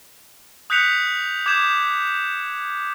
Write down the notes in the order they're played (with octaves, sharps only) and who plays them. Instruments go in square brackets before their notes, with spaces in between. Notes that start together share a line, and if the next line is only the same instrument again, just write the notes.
[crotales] D#6 F#6 G6 B6 C#7 F7
D6 G6 G#6 E7